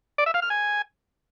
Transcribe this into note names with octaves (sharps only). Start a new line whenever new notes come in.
D5
E5
F5
F6
G#5